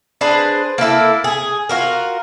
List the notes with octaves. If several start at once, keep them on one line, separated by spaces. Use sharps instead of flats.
D4 G#4 B4 C5
A#3 D4 E4 A4
G#4
F4 F#4 A#4